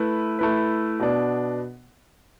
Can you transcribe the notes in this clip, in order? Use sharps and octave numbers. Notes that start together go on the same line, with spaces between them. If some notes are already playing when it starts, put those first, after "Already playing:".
Already playing: A3 E4 B4
A3 E4 B4
B2 B3 D4